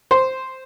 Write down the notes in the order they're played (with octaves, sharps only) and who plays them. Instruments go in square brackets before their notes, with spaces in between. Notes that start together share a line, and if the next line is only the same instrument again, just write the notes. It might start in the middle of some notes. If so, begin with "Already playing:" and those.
[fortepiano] C5